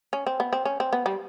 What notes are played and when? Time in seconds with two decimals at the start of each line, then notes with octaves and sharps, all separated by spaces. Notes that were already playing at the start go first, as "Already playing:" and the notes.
0.13 C#4
0.27 C4
0.40 B3
0.53 C4
0.65 C#4
0.80 C4
0.93 B3
1.06 G3